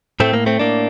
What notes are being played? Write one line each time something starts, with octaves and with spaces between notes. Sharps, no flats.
A2 A3 C4
A#3
A3 C4
A2 A#3 D4